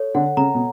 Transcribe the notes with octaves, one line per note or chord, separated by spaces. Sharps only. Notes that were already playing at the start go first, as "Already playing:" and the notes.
Already playing: A4 C#5
D3 F#5
C#3 A#5
B2